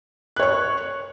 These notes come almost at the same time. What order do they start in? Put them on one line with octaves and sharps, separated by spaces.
F#6 C#5 C#6